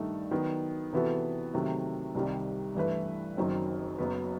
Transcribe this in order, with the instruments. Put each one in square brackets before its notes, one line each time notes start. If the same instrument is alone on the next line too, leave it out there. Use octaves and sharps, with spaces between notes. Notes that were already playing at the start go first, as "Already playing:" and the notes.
Already playing: [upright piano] G2 D#3 A3 D#4 A4
D#3 F#3 B3
C3 E3 B3 F#4 A4
C3 D#3 F#3 A3
C2 C3 D#3 G3
G2 E3 A3 E4 B4
F#1 F#2 D#3 F#3 C4
F#1 F#2 F#3 B3